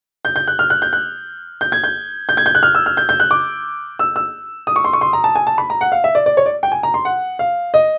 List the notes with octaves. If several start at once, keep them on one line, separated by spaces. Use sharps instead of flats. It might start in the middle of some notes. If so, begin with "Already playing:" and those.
G6
G6
F#6
F6
F#6
G6
F#6
G6
G#6
G6
G6
G#6
G6
F#6
F6
E6
F6
G6
G6
F#6
D6
E6
E6
D#6
C#6
C6
C#6
C6
A#5
A5
G#5
A5
B5
A#5
F#5
F5
E5
D5
D5
C#5
D5
G5
G#5
A#5
C6
F#5
F5
D#5